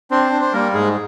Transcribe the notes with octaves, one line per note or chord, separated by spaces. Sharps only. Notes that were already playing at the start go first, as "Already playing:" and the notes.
C4 D4 C5
D4
C5
G3 A#3 A#4
G#2 G#3 G#4